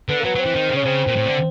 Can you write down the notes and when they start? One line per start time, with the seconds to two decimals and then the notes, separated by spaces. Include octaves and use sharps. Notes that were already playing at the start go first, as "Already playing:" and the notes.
0.09 D3 B3
0.20 A#3
0.24 F#3 B3
0.35 F#3 C4
0.45 E3
0.55 D#3
0.70 C#3
0.76 C#4
0.85 C#3 C4
1.07 A#2
1.16 A2
1.26 D3